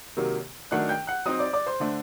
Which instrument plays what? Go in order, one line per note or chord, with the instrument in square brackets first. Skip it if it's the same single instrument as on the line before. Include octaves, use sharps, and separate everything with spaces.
[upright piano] C3 D#3 F#3 A#3
D#3 F#3 A3 D4 F#5 F#6
G5 G6
F#5 F#6
F#3 C4 D#4 D#5 D#6
D5 D6
D5 D6
C5 C6
D3 A3 D4